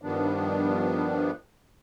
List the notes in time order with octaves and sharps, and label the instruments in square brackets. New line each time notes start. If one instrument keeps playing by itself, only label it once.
[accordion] G2 D#3 F3 G3 B3 D4